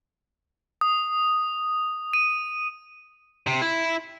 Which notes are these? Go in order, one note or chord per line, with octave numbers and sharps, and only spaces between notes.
D#6
D#7
C3
E4